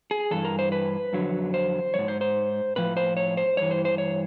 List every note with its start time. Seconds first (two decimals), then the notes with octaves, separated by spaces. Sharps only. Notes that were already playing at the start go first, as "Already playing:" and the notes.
0.11 G#4
0.31 G2 E3 A4
0.45 A#4
0.59 C5
0.72 B4
1.13 F2 D3 F#3
1.54 C5
1.94 E3 C#5
1.99 G#2
2.08 C5
2.21 C5
2.76 A2 F3 B4
2.97 C5
3.17 C#5
3.37 C5
3.57 G2 E3 C#5
3.71 C5
3.85 C5
3.98 C#5